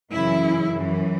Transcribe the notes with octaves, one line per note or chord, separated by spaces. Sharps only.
F#2 C#3 E3 E4
F#2 E3